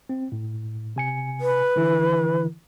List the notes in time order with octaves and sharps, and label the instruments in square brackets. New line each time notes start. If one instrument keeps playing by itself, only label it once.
[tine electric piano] C4
A2
C3 G#5 C#7
[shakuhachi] B4
[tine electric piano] D3 E3 E4